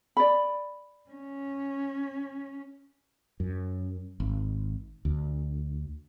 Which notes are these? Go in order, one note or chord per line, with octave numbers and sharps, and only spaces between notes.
D5 B5
C#4
F#2
G#1
D2